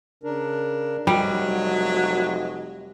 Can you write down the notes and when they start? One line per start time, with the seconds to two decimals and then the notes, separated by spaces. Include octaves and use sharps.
0.23 C#3 D4 A#4
1.07 F1 F#3 G3 D#5